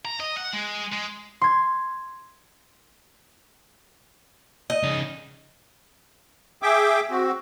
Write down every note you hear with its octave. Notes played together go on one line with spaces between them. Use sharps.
A#5
D#5
F#5
G#3
G#3
C6 G#6
D#5
C#3 D#4
G#4 E5 G5 D6
C4 F#4